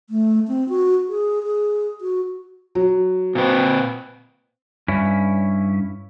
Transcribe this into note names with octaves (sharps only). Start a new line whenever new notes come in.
A3
C4
F#4
G#4
G#4
F#4
F#3
A#2 C4 B4
G2 C#4 E4